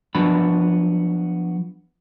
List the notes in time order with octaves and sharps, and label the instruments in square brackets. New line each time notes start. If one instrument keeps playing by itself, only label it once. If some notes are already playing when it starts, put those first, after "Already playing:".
[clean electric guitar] F3 F#3 B3 D4 B5